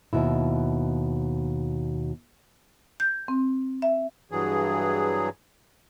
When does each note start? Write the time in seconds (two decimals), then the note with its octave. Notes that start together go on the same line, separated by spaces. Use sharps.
0.13 D#2 B2 E4
3.00 G6
3.28 C4
3.82 E5
4.31 G2 E3 F#3 G#4